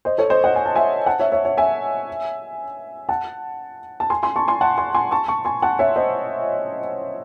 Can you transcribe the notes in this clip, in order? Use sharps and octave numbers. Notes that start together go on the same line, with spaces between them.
C5 D#5
A4 C#5
C5 D#5
D#5 F#5
G#5
A5
E5 G#5
F#5 A5
C#5 E5
C#5 E5
C#5 E5
E5 G#5
F#5 A5
A5
G#5 C6
G#5 C6
A5 C#6
G#5 C6
F#5 A5
G#5 C6
G#5 C6
A5 C#6
A5 C#6
G#5 C6
F#5 A5
C#5 E5
C5 D#5